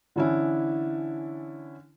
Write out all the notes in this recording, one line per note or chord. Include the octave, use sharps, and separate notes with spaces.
D3 E3 C#4 D4 E4